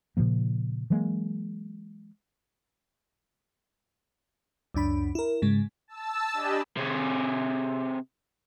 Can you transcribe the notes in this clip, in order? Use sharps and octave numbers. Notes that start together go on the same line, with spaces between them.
A#2 C#3 F3 A#3
E3 F#3 G#3 A#3
C#2 F#2 D4 B5
E4 A#4
G#2 C#3 G#3
A5 E6
D4 G4 D#5 G#5 B5
C3 G#4